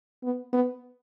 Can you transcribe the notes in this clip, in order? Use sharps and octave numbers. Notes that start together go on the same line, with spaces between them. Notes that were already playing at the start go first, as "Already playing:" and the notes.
B3
B3